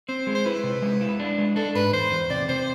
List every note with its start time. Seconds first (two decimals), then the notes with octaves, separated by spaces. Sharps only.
0.09 C4 C5
0.27 G#3
0.35 C5
0.46 E4 B4
0.64 C3
0.82 G#3
1.01 E4
1.19 D4
1.38 G#3
1.56 D4 A4
1.75 G#2 B4
1.93 E2 C5
2.12 E2
2.30 C3 D5
2.49 C3 C5